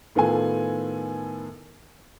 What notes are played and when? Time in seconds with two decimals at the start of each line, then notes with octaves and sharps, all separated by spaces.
0.15 A2 D#3 B3 F4 A4 G#5